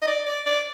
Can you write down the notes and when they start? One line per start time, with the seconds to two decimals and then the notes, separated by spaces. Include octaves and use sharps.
0.02 D#5
0.07 D5
0.26 D5
0.46 D5